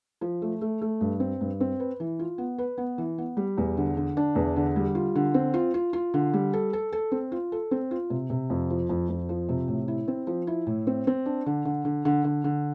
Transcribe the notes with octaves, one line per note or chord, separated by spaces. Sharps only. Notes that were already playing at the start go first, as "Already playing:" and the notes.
F3
A3
A3
A3
G2
C4
G2
C4
B4
E3
F4
B3
B4
B3
E3
B3
G3
E2
D3
D3
D4
E2
D3
G3
F4
D3
C4
F4
F4
F4
D3
G3
A4
A4
A4
C4
F4
A4
C4
F4
C3
C3
F2
F3
F2
F2
F3
C3
A2
E4
C4
F3
E4
A2
C4
C4
D4
D3
D3
D3
D3
D3
D3